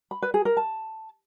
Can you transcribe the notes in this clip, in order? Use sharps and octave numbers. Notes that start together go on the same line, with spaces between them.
B5
B4
G#4
A#4
A5